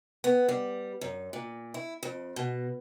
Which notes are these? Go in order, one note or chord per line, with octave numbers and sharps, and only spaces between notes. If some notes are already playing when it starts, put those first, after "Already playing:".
B3
G3
F#2
A#2
E4
F2
B2